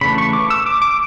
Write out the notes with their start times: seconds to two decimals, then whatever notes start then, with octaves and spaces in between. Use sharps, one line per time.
0.01 C#3 E3 A3 D4 B5
0.18 C#6
0.33 D6
0.50 E6
0.66 D6
0.82 D6